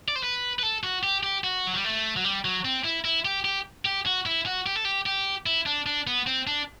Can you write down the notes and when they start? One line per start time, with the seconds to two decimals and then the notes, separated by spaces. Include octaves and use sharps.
0.08 D5
0.16 C5
0.23 B4
0.59 B4
0.63 A4
0.83 F#4
1.03 G4
1.23 G4
1.44 F#4
1.67 F#3
1.75 G3
1.84 A3
2.17 F#3
2.24 G3
2.45 F#3
2.65 C4
2.84 E4
3.05 E4
3.25 G4
3.45 G4
3.85 G4
4.06 F#4
4.26 E4
4.46 F#4
4.66 G4
4.76 A4
4.85 G4
5.06 G4
5.46 E4
5.66 D4
5.86 D4
6.07 B3
6.27 C4
6.47 D4